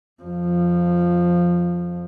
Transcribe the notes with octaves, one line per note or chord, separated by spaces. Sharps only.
F2 F3